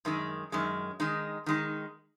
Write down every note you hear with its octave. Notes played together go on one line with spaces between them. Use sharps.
F#2 D#3 G#3
F#2 D#3 G#3
D#3 G#3 D#4
D#3 G#3 D#4